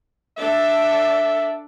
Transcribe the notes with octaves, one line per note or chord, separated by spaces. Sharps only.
D4 A4 E5